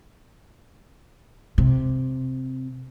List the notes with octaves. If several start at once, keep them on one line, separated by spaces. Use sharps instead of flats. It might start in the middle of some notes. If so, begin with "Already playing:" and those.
C3